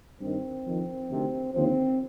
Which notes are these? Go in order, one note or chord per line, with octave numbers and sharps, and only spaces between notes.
G2 D#3 C4
F2 D#3
D2 C3 D#3
D#2 D3 F3 C4